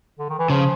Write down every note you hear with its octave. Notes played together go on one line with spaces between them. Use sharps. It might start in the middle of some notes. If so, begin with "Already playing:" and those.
D3
D#3
E3
C#3 F3